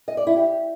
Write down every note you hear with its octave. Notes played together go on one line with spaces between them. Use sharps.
D#5
D5
E4
G4